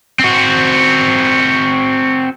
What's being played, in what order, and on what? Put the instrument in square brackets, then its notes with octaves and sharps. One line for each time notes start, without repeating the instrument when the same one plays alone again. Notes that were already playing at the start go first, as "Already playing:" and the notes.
[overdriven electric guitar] C4 F#4